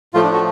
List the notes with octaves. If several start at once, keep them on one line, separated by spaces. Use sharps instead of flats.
A2 F3 A3 F4
D4
F#4